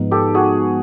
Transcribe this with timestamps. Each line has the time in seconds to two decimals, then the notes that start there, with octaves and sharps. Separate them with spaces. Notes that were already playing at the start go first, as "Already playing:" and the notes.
Already playing: G#2 F3 G#3 B3 D#4
0.11 G4 A4
0.34 F#4 G#4